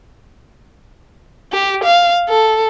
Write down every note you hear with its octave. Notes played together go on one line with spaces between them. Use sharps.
G4
F5
A4